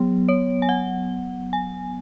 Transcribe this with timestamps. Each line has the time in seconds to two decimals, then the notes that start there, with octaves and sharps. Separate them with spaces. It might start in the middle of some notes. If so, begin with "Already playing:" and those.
Already playing: F#3 B3
0.29 C#5
0.62 G#5
0.69 F#5
1.53 G#5